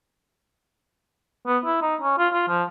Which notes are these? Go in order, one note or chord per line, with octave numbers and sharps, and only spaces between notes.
B3
E4
D#4
C#4
F4
F4
F3